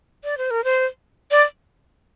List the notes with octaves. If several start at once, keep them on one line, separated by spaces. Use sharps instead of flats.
D5
C5
A#4
C5
D5